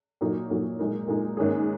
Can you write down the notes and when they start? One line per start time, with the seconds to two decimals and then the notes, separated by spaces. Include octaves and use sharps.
0.21 A#2 F#3 A#3 D#4 F#4
0.50 A#2 F#3 A#3 D#4 F#4
0.79 A#2 G#3 D#4 A#4
1.08 A#2 G#3 D#4 A#4
1.37 G#2 D#3 A#3 C#4 G#4